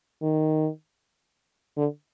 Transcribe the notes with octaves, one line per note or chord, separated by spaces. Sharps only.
D#3
D3